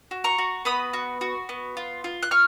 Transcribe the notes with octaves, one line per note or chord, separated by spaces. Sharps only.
F#4
A#5 C#6
F#4
B3 B5 D#6
F#4
F#4
B3
F4
F4
F#6
F4 C#6 F6